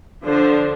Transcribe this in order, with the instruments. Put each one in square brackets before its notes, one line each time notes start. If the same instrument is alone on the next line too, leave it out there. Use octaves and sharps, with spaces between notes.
[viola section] D3 F3 D4 C5